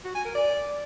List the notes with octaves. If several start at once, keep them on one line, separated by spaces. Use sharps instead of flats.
F#4
G#5
A#4
D5